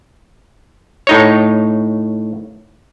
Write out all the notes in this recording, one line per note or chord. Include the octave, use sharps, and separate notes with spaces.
A2 D#4 C#5